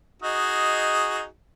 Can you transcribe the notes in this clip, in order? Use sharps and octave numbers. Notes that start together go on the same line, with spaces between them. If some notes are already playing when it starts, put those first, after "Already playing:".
D#4 F#4 G#4 D#5